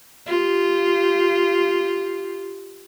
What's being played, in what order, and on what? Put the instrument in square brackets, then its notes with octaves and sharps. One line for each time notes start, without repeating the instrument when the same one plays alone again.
[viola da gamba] F4 G4